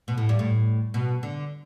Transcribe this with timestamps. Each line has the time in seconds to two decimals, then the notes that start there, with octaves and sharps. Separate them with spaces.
0.08 B2
0.18 A2
0.29 G2
0.39 A2
0.94 B2
1.23 D3